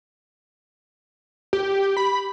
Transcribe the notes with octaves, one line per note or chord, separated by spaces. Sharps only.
G4
B5